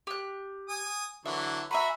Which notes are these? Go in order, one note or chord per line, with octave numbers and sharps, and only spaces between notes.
G4 F#6
G#5 D#6
D3 E3 F#3 E5
F#4 E5 G#5 A#5 B5